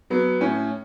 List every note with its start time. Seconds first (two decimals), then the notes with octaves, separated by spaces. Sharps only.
0.10 F#3 B3
0.40 A2 C#4